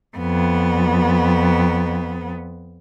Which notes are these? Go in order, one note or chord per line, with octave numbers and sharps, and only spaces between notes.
F2 B3